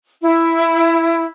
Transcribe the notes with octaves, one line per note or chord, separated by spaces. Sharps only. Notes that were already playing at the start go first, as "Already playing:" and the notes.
E4